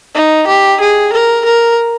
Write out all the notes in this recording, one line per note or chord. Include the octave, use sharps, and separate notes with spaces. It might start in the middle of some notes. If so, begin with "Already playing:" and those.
D#4
G4
G#4
A#4
A#4